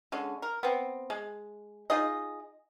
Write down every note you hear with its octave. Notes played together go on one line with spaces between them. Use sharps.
D3 G#3 C#4
A#4
B3 C4
G#3
D#4 F4 G#4 D#5